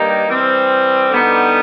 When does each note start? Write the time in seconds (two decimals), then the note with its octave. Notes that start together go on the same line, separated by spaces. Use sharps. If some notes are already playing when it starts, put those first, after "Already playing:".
Already playing: G2 D#3 G3 A#3 D#4
0.28 E3 G3 C4
1.10 D3 G3 B3 D#4